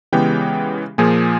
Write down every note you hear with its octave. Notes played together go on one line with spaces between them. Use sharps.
C#3 E3 G#3 B3 G4 G5
A#2 F3 A#3 G#4 G#5